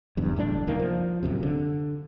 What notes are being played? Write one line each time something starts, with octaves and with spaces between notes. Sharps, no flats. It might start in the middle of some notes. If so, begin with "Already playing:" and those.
F#1 E2 G2
F#1 A2 C#4 D4
C2 D#3 A#3
F3
D1 B1 F#2 C3
D3